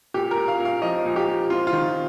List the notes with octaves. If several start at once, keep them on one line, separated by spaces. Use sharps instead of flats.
A#2 G4
A#4
A#2
F5
A#2
F5
F3 D#5
A#2
G4
A#2
C4 F4
F4
D#3